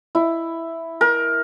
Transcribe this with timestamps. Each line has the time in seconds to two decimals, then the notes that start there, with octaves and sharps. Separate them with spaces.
0.15 E4
1.01 A#4